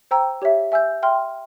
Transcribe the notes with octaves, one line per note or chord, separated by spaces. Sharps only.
C5 G5 A#5 E6
G4 C#5 E5
E5 G#5 E6 G6
E5 G5 C6 F6